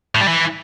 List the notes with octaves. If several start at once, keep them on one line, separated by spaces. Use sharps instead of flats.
A2
G3
E3